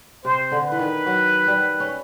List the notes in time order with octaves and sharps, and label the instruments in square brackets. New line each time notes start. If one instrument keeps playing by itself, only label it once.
[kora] C3 [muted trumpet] C5
[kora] D3
[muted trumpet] B4
[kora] E3
D#3
F#3
G3
C#4